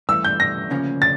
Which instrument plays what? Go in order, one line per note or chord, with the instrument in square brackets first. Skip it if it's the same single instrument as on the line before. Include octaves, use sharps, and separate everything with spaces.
[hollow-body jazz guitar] G2 E3 A3 [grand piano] E6
[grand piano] G6
A#6
[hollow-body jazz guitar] D2 C#3 F3 A#3 C#4
[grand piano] A6